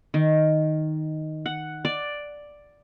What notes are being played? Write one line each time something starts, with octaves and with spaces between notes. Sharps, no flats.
D#3
F#5
D5